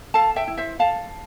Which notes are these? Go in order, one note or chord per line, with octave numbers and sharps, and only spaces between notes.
A4 F5 A5
E5 G5
E4
C5 E5
A4 F5 A5